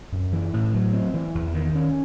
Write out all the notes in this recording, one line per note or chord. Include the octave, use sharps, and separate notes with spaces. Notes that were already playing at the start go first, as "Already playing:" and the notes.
F#2
E3
A2
F#3
C4
E3
E2
D#3
C#4